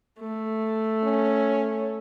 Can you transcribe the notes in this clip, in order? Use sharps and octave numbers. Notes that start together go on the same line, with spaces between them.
A3
C#4